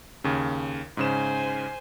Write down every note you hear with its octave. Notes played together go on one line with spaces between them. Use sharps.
D#2 C#3
G#2 C#3 C5 G#5 E7